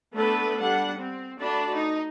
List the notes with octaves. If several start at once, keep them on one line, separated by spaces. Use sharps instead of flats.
A3 B3 D4 A4 B4
G3 D4 F#5
C4
A3 D4 F#4 D5 A5 B5
D#4